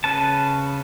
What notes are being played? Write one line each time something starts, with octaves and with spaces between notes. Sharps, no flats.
C#3 C#4 B4 A5